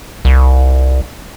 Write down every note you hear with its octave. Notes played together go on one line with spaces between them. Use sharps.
C2